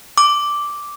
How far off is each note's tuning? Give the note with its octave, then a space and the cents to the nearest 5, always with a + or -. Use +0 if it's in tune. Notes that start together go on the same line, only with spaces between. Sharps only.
D6 -5